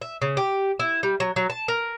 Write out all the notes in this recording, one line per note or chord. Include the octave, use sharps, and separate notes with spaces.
E5
C#3
G4
E4
G3
F#3
F#3
A5
A#4